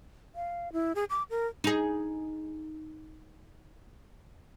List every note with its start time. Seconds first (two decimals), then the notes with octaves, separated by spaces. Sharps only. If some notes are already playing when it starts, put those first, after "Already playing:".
0.35 F5
0.73 E4
0.95 G#4
1.10 D6
1.30 A#4
1.64 D#4 G#4